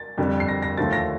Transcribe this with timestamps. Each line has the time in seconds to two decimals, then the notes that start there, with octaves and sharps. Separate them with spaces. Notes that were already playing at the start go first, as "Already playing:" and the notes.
Already playing: A6
0.18 F2 D3 G3
0.40 C7
0.48 A#6
0.62 A#6
0.78 D#2 D3 F3 A3 A6
0.93 A#6